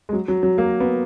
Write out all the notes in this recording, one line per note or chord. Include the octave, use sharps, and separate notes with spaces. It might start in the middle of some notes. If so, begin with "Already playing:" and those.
G#3
F#3
F#3
F#3
A#3
B3